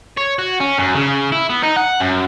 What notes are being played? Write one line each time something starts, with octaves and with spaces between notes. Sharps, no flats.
C#5
F#4
C#4
F#2
C#3
E4
B3
D#4
F#5
F#2